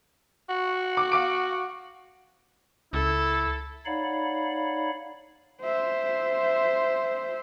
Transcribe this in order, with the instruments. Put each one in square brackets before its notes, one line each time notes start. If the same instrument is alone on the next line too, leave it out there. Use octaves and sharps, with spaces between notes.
[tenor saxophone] F#4
[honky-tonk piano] D6
F5 D6 D7
[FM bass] C#2 [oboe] E4 [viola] A4
[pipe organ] D#4 C#5 D5 F5 F#5 B5
[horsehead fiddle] C5 E5